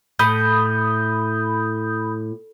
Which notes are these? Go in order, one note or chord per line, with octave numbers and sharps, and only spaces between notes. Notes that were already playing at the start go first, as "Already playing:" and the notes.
A2 B5 D#6 G6